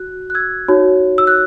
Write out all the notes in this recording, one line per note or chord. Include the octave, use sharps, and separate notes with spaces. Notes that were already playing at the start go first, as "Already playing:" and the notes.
Already playing: F#4 F#6
F#6
E6 G#6
D#4 F#4 C#5
E6
F#6